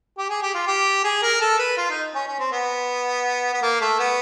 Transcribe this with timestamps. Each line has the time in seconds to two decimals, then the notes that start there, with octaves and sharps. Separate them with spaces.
0.18 G4
0.29 G#4
0.42 G4
0.54 F4
0.67 G4
1.04 G#4
1.22 A#4
1.41 A4
1.59 B4
1.77 F4
1.90 D#4
2.15 C#4
2.27 C#4
2.39 C4
2.52 B3
3.53 B3
3.62 A#3
3.81 A3
3.99 B3